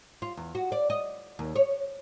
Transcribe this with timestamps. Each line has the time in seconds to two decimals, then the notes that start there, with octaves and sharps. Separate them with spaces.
0.22 F4
0.37 E2
0.55 F#4
0.72 D5
0.90 D#5
1.39 D#2
1.56 C#5